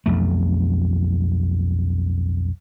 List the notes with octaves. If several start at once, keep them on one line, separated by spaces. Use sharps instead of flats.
B1 F2 A3